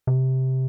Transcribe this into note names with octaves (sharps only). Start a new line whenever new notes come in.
C3